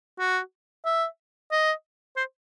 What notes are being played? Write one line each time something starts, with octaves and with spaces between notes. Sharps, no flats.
F#4
E5
D#5
C5